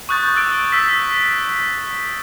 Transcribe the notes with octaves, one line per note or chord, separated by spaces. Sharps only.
C#6 D#6 F#6 G6 A6
D6 E6 A6 D7
E6 B6 E7